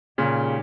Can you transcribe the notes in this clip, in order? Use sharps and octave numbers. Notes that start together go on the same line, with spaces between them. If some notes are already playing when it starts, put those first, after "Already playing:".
A#2 C#3 G#3 D#4 G4